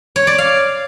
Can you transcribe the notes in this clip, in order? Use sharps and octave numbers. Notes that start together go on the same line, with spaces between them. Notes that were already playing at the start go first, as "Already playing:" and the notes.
C#5
D5
F5